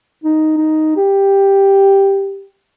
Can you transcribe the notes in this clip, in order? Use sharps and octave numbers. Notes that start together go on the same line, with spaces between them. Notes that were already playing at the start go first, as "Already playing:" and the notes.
D#4
D#4
G4